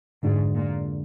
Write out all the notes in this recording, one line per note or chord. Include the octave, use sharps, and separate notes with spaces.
F2 G#2 D3 G#3 D4 F#4
A#2